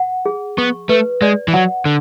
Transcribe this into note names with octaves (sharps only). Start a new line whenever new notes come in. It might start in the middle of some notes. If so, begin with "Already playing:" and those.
Already playing: F#5
G#4
B3 C#6
A3 B4
G#3 D5
E3
F#3 F#5
D3